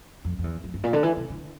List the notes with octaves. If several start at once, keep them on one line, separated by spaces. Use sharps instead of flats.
F2
F2
E2
F2
G2
A#2
D3
E3
C3
D3